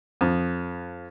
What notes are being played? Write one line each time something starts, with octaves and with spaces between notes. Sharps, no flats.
F2